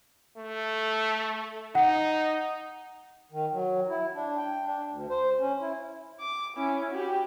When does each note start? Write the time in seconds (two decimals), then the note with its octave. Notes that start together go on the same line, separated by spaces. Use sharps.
0.37 A3
1.75 D#4 F#5
3.32 D#3
3.52 F#3
3.89 E4
4.15 D4
4.37 G5
4.65 D4
4.88 D2
5.10 C5
5.39 C#4
5.60 E4
6.19 D6
6.57 C#4 E4
6.91 F#4 G4